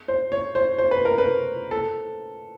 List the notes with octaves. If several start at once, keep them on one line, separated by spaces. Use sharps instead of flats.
C5
C#5
C5
C5
B4
A#4
B4
A4